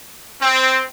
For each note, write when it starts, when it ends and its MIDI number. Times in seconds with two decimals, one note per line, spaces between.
0.42 0.82 60